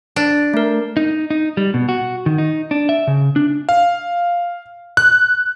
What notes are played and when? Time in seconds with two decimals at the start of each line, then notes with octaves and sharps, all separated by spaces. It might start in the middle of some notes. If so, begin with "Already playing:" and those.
0.16 D4
0.54 A3 A#4
0.97 D#4
1.30 D#4
1.57 G3
1.74 B2
1.89 F#4
2.26 D#3
2.38 D#4
2.71 D4
2.89 E5
3.07 C#3
3.36 D4
3.69 F5
4.97 F#6